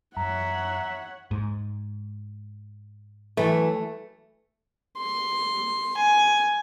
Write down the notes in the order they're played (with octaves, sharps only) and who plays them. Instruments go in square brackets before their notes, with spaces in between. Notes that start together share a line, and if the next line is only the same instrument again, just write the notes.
[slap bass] F#2 [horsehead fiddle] C#5 F#5 [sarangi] E5 [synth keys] A#5
[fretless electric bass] G#2
[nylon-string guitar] E3 F#3 B4 [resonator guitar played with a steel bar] A3
[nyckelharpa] C6
G#5